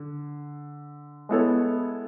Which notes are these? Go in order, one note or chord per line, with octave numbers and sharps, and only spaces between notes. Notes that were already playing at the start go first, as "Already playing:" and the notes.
Already playing: D3
G#3 B3 E4 A4 C#5